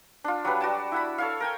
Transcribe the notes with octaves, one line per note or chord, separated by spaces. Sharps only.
D4 F4
F#3 G3 B4
G3 F#4 D5 A5
E4 F#5 B5
A4 C#5 F5
A#4 G5 G#5